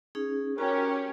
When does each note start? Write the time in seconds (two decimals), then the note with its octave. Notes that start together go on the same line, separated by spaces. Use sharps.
0.15 C#4 D#4 G#4
0.58 C#4 F#4 G4 A#4 C#5